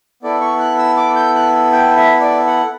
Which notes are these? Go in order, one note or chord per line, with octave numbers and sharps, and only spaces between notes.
B3 E4 A4 D5
C#6
F#6
E6
D6
G6
F#6
G5
E5
D5
F#5